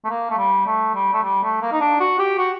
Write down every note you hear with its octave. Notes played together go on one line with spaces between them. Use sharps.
A3
A#3
A3
G3
A3
G3
A3
G3
A3
A#3
D#4
D4
F#4
G4
F#4